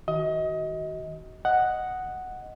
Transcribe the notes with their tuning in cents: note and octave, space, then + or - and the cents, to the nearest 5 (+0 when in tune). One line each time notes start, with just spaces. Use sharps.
D#3 +30 F#4 +25 D#5 +25
D#5 +0 F#5 +0